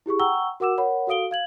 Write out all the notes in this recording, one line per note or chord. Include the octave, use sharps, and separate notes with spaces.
E4 G4 G#4 C#6
F#5 G5 A#5 C#6 E6 G7
F#4 A#4 F#5 D6 E6 E7
A#4 C#5 F#5 B5
F#4 A4 F5 D#6 D7 G7
F5 G#6 F#7